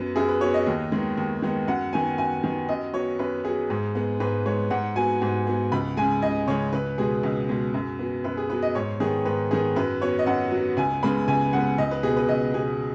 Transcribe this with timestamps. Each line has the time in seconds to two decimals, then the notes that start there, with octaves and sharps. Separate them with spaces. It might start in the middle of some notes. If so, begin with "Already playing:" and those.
Already playing: F#2 F#3 B3
0.16 F#2 G#4
0.29 B4
0.41 F#3 B3 C#5
0.54 D#5
0.67 D#2
0.92 D#3 G#3 B3
1.17 D#2
1.42 D#3 G#3 B3
1.68 F#2 F#5
1.93 D#3 B3 G#5
2.18 F#2 G#5
2.44 D#3 B3
2.69 F#2 D#5
2.93 F#3 B3 C#5
3.19 F#2 B4
3.45 F#3 B3 G#4
3.70 G#2
3.95 G#3 B3
4.20 G#2 B4
4.46 G#3 B3 C#5
4.70 G#2 F#5
4.96 F#3 B3 G#5
5.22 G#2
5.47 F#3 B3
5.72 C#2 B5
5.97 C#3 G#3 G#5
6.23 C#2 D#5
6.48 C#3 G#3 C#5
6.73 C#2 B4
6.98 B2 G#3 B3 G#4
7.23 C#2
7.49 B2 G#3 B3
7.74 F#2
7.99 F#3 B3
8.24 F#2 B4
8.37 G#4
8.50 F#3 B3 B4
8.63 D#5
8.75 G#2 C#5
9.00 D#3 B3 G#4
9.25 G#2 B4
9.51 D#3 B3 G#4
9.76 F#2 B4
10.02 F#3 B3 C#5
10.19 D#5
10.26 F#2 F#5
10.52 F#3 B3
10.77 C#2 G#5
11.03 C#3 G#3 B3 B5
11.28 C#2 G#5
11.53 C#3 G#3 B3 F#5
11.78 C#2 D#5
11.91 B4
12.03 B2 B3 G#4
12.17 B4
12.29 C#2 D#5
12.54 B2 B3 G#4